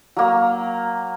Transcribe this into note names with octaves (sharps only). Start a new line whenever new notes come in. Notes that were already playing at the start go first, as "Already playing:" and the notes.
F#3 A#3